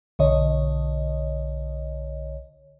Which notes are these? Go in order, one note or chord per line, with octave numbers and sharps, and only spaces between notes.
B1 D3 C#5 D#5